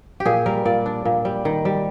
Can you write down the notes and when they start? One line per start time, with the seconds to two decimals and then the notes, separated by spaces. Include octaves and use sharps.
0.20 G4
0.25 A#2 G#4
0.46 G3 A#4
0.65 A#2 D5
0.86 D4
1.05 A#2
1.25 G3
1.45 D#3
1.65 G3